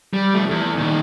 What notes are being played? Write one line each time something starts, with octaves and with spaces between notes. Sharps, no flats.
G3
F3 A3
E2
A#2 D#3